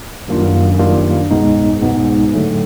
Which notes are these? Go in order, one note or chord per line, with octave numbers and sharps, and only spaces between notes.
F#2 D#3 G3 A#3 D4 F4
D#3 G3 A#3 D4 F4
C2 G#2 B2 G#3 B3 D#4
C2 G#2 B2 G#3 B3 D#4
A2 D3 F#3 A3